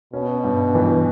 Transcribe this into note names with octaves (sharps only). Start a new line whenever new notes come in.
B2 C#4
G2
E3